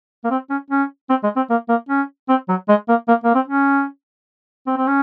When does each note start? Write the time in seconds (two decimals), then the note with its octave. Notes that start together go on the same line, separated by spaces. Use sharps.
0.24 A#3
0.30 C4
0.50 C#4
0.71 C#4
1.10 C4
1.23 G#3
1.36 C4
1.50 A#3
1.69 A#3
1.89 C#4
2.29 C4
2.49 F#3
2.69 G#3
2.89 A#3
3.08 A#3
3.24 A#3
3.35 C4
3.48 C#4
4.67 C4
4.77 C4
4.87 C#4